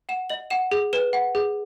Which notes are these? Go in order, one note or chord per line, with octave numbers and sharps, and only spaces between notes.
F#5 E7
D#5 F#7
F#5 E7
G#4
B4 E7
F#5
G#4